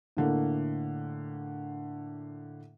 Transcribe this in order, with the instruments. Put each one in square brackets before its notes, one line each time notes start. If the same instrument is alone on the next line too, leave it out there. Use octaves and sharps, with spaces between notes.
[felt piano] A2 D3 A#3